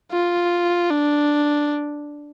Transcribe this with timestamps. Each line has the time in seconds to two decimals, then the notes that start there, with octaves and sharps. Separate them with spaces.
0.12 F4
0.90 D4